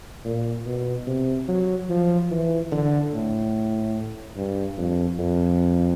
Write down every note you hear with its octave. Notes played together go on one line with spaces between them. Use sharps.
A#2
B2
C3
F#3
F3
E3
D3
A2
G2
F2
F2